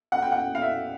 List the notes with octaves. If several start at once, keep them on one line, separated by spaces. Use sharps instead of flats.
F#5
G5
F#5
F5
E5